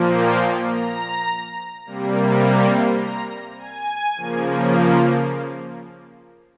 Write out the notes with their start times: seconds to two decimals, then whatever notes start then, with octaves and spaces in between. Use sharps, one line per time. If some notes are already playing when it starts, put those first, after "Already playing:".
Already playing: A#2 F3 A#3
0.15 G5
0.72 A#5
1.86 C3 G3 A#3
2.43 A#5
2.72 C6
3.00 A#5
3.58 G#5
4.16 C#3 F3 A#3